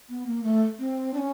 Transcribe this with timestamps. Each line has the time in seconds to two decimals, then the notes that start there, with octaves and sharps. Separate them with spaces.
0.09 B3
0.27 A#3
0.43 A3
0.79 C4
1.14 D4
1.18 C#4